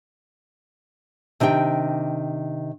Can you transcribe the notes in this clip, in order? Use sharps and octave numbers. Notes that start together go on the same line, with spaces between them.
C3 D#3 D4 G4 G5